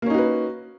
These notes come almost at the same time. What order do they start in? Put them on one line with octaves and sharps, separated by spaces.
A#3 C#4 D#4 F#4 B4